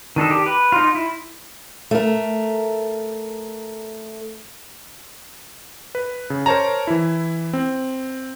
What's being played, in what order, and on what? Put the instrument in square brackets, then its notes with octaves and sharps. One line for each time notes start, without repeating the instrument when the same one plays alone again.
[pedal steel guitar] D#3 D4 D#4 A4
G4
B4
D#4 F4
E4
[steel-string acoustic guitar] A3 A#4
[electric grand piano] B4
C#3
A#4 C5 C#5 A5 A#5
E3 E4
C4